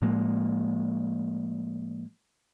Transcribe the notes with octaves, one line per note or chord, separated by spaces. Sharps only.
A2 F3 G#3 A#3